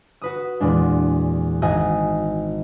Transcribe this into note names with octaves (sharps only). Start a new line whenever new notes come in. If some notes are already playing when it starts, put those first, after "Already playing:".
F#4 B4 D#6
E2 A#2 G#3 D4
G#1 D#5 F#5 G#5 A5